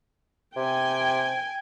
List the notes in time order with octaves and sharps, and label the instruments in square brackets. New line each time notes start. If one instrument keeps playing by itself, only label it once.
[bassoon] C3 [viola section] G5 G#5